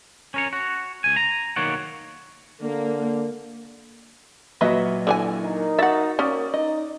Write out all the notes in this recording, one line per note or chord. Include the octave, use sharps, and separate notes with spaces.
C#4 A#4 C#5
F#4
C#2 G#5
A#5
B1 D#3 A#3 C#5 D5 F#5
D3 A#3
A#2 F#3 F#4 B4 D#5 E5
D3 E3 G#5
D#4 A#4
F#4 E5 F#5 A6
A#3 C#4 D5 D#6
D#4 D#5